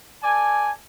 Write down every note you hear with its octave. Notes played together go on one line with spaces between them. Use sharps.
A4 D5 G#5